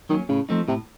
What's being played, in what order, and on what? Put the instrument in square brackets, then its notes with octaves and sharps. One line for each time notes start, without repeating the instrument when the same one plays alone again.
[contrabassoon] D#3 [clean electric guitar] F#3 A#3 C#4
[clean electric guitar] A2 [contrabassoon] C#3
[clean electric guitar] F3 A3 C4 D#4
[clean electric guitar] A2 [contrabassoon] C3